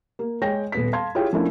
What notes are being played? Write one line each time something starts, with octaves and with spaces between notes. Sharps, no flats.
A#3
G#3 C#5 G5 A#6
D#1 B3 B6
F5 A5 C6 G#6
E4 F4 G4 G#4 C#5 G5
F3 A3 A#3 C#4 D4 E4